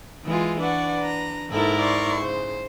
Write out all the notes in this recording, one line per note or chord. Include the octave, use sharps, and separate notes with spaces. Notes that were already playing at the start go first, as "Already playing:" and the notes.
E3 G#3 F4
D4 B4 D5 F#5 C#6
A#5
G#2 A#3 E4 A4 A#4
D5 C6 C#6
C#3 C5